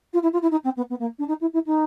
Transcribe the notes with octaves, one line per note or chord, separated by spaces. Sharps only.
F4
E4
F4
E4
D#4
C4
B3
B3
A#3
D4
D#4
E4
E4
D#4